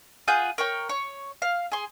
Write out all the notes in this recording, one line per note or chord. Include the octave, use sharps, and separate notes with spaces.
F4 G#4 F#5 G6
A#4 C#5 G5
C#5
F5
G#4 C6